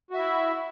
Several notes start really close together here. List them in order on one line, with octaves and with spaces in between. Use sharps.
F#4 E5 E4